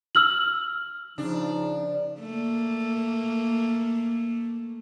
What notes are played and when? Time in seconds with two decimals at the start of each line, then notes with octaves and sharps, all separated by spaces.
0.15 E6 F6 F#7
1.18 C#3 F3 D4 D#4
2.20 A3 A#3